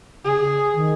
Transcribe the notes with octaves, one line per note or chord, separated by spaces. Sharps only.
C#3 G#4
D#3